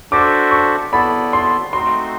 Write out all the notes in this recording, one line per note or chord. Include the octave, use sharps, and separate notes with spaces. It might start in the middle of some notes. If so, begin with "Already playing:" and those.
D4 F#4 A4 C5 E5 D6
C#6
B3 E4 A4 D5 B5
C6
A3 C4 D#4 F#4 C6